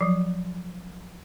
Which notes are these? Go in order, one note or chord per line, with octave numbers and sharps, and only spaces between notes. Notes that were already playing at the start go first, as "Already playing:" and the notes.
F3 F#3